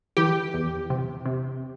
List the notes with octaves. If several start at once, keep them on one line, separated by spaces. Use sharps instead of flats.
E3 G4
E2
C3
C3